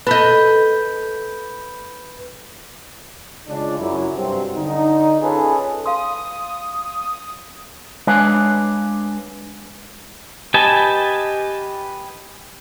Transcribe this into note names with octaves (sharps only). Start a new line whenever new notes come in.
A4 B4 D#5 B5 G6
C#3 G#3 D4 F4
F#2 E4
G2 C3 F#3 C4
D3 D#4
C#4 F4 G#4 A4 B4
F5 C6 D#6
G#3 D4 B4 C#5 F5 G#5
G4 B4 D#5 G#5 A5